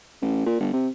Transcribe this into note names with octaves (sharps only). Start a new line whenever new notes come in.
A1
A#2
G1
C3